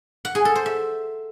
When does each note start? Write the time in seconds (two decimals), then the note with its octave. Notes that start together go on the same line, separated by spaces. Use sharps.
0.25 F#5
0.35 G#4
0.45 A4
0.55 C5
0.66 E5